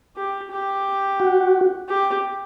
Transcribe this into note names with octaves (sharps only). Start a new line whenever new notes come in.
G4
G4
F#4
G4